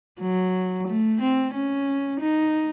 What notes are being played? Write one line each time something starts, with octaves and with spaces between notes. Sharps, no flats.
F#3
A3
C4
C#4
D#4